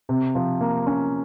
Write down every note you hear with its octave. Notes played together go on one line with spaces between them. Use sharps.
C3
F3
A#3
C#4